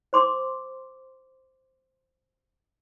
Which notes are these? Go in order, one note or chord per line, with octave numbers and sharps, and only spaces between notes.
C5 C6 D6